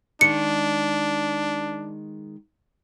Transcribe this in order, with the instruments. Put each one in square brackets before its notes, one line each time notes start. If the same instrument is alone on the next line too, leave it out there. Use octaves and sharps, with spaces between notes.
[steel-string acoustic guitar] D#3 G#3 [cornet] D4 [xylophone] C#7